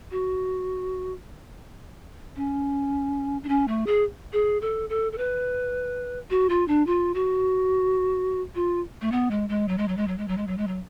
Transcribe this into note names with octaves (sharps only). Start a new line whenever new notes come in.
F#4
C#4
D4
C#4
A3
G#4
G#4
A4
A4
A4
B4
F#4
F4
D4
F4
F#4
F4
A3
B3
G#3
G#3
F#3
G#3
F#3
G#3
F#3
G#3
F#3
G#3
F#3
G#3
F#3